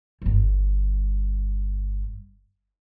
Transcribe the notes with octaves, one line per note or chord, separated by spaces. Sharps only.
G1 G2